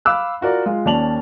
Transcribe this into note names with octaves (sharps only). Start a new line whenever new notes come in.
F5 B5 D6 E6 F#6
F4 F#4 A#4 D5
G#3 F4
D#2 C#4 D5 A5 F7 F#7